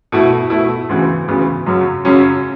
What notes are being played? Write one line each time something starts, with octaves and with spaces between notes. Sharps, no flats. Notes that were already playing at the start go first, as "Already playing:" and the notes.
B2 A3 E4
B2 A3 E4
D2 C#3 E3 B3 F#4
D2 C#3 E3 B3 F#4
F#2 C#3 F#3 C#4
F#2 C#3 F#3 C#4